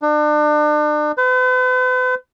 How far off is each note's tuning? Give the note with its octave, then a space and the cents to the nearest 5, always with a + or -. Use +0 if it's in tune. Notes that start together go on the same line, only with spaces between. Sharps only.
D4 +35
B4 +45